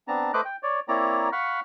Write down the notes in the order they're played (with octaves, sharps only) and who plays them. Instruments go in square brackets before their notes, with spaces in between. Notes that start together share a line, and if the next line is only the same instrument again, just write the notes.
[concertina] B3 C4 D4 A5 A#5
A3 B4 C5 D#5 D6 F#6
G5
C#5 D5
A#3 C4 E4 C#5 D5 A#5
F5 F#5 B5 C#6 F6